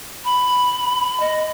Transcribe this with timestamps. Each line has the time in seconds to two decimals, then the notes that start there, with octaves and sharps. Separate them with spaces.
0.25 B5
1.20 D#5